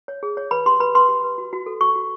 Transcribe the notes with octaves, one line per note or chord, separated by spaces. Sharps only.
C#5
G#4
C#5
B4 B5
G4 C6
B4 B5
B4 C6
G4
B4
F#4
F#4
A4
F#4 C#6
F#4